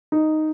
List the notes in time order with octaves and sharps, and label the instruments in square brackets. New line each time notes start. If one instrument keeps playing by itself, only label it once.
[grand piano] D#4